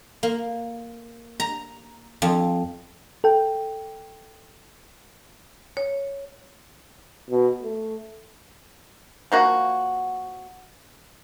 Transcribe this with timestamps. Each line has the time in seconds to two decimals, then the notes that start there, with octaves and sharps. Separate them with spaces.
0.23 A#3
1.40 A#5
2.22 F2
3.24 A4 G5
5.77 C#5
7.30 B2
7.63 A3
9.32 F3 A#3 F#4